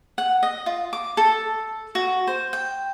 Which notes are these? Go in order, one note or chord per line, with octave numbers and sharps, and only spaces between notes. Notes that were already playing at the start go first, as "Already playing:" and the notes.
F#5
D#5
F4
D6
A4
F#4
C5
G5